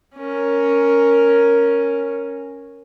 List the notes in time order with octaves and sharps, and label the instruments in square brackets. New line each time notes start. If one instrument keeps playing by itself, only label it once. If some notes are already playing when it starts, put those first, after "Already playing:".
[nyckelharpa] C#4 A#4